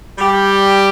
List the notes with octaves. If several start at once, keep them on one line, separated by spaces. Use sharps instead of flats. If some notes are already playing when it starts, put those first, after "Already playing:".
G3 G4